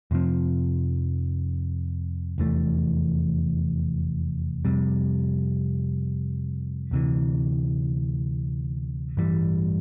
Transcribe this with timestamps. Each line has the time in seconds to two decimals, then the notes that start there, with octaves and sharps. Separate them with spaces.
0.11 F2 C3 F3 C4
2.38 F1 E2 E3 A3
4.65 F2 C3 G3
6.91 D2 C3 E3
9.17 A1 G2 E3 G3